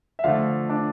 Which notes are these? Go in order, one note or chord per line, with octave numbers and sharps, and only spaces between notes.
E5
D3 F3 A3 F4 F5
D4 D5